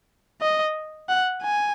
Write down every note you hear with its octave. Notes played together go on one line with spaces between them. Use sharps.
D#5
F#5
G#5